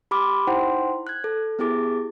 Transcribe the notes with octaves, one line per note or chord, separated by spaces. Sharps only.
G4 B5 C6 D6 F6
D#4 E4 C5 F#5 G5 C6
F#6 G#6
A4
B3 E4 G4 G#4 D6 A6